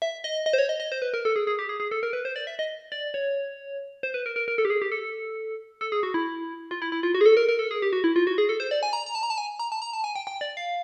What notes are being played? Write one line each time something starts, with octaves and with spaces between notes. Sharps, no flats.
E5
D#5
D#5
C5
C#5
D#5
D#5
C5
B4
A#4
A4
G#4
G#4
G4
G#4
G#4
A4
A#4
B4
C5
D5
E5
D#5
D5
C#5
C5
B4
A#4
A#4
A#4
A4
G4
G#4
G4
A4
A4
G#4
F#4
E4
F4
E4
E4
F4
F#4
G#4
A4
A#4
A#4
A4
G#4
G4
F#4
E4
F4
F#4
G#4
A4
C5
D5
G#5
A#5
A#5
A5
A#5
A5
G#5
A#5
A5
A#5
A5
G#5
G5
G5
D5
F5